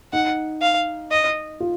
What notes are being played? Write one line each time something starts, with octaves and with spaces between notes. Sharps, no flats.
D#4 F#5
F5
D#5
F4